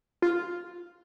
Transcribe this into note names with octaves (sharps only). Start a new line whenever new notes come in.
F4